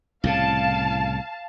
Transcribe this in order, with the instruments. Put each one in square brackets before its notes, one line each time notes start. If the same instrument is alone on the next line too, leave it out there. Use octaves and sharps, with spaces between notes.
[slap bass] C2 A2 C#3 [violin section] F5 A5